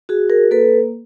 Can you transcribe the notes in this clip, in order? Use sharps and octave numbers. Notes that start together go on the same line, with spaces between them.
F#4 G#4
G#4 A#4
A#3 A4 B4